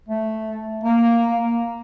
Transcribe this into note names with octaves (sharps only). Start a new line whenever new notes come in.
A3
A#3